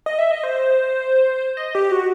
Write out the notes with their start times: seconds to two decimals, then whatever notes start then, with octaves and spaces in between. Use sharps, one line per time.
0.06 D#5
0.18 E5
0.31 D#5
0.44 C5
1.57 D#5
1.75 G4
1.92 F#4